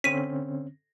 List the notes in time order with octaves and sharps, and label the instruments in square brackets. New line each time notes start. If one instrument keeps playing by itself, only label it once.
[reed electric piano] D3 C4 C#4 [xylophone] B6 D#7